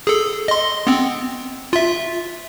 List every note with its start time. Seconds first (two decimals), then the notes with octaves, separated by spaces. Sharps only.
0.07 G#4 A4
0.48 D#5 C6
0.87 B3 C4
1.73 F4 E5